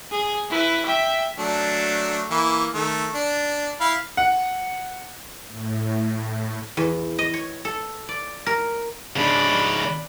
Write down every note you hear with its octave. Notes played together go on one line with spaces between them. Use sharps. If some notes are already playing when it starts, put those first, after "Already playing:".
G#4
E4 B4
E5 G5
F#3 A3 D4
E3 A#3 E4
D#3 A3
D4
E4 F5 B5
F#5
A2
E2
D#5
C#5
A4
D5
A#4
G#2 C#3 D4 B5